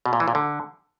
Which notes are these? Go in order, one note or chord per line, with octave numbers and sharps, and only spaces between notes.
B2
A#2
E3
A#2
D3